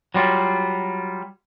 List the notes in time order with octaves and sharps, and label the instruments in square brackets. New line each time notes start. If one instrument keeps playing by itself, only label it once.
[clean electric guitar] F#3 G3 F4